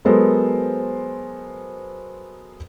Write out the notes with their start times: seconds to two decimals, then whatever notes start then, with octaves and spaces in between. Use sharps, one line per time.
0.05 F#3 G#3 B3 A4 A#4 C5